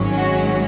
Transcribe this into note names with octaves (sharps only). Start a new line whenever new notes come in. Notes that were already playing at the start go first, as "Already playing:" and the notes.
Already playing: G#1 G#2 F#3 C#4
F#4